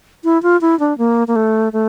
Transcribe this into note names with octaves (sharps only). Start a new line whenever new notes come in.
E4
F4
E4
D4
A#3
A#3
A3
A3